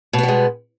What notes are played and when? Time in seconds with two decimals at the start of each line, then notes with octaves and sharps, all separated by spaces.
0.13 B2
0.18 B3
0.23 G3
0.28 G#3